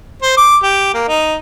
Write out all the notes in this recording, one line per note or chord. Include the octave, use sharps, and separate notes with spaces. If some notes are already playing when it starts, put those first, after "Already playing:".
C5
D6
G4
A#3
D#4